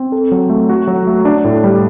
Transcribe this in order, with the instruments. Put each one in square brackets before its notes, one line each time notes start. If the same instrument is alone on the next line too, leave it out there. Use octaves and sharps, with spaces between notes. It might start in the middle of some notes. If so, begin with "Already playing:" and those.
Already playing: [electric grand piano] C4
A4
F#3
A3
F#4
F#3
A3
D4
A2
G3